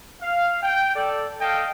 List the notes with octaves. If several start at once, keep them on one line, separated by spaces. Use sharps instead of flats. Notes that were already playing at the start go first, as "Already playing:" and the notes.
F5
G5
A4 D5
A4 D#5 F5 G5